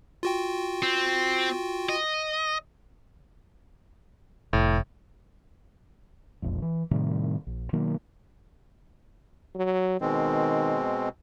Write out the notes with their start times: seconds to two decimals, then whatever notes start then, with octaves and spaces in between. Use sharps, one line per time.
0.23 F4 F#4 G5
0.82 C4
1.89 D#5
4.53 F1 A2
6.42 E1 A#1 F2
6.62 E3
6.91 A2 C3 D#3 G3
7.47 A#1
7.73 B2 D#3 F#3 A#3
9.55 F#3
10.01 B2 D#3 G#3 C4